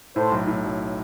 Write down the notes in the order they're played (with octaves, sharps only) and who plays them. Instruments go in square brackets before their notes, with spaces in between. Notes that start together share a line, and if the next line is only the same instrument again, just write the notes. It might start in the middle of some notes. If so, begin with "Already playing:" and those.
[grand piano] A2 [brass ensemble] A4 C5
[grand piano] B1
A2
B1